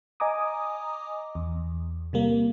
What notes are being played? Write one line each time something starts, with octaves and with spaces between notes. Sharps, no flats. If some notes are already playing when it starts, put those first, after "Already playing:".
D#5 G#5 A#5 D6 D#6
E2
C3 G3 A#3